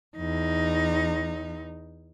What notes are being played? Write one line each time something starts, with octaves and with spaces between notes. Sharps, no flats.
E2 D#4